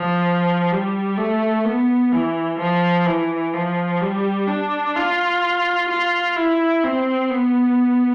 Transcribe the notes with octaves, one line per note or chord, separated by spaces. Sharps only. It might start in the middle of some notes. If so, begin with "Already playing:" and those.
Already playing: F3
G3
A3
B3
E3
F3
E3
F3
G3
D4
F4
F4
E4
C4
B3